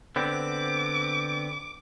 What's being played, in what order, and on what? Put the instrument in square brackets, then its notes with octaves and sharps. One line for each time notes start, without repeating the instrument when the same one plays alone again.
[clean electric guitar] D3 B3 C4 [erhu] D6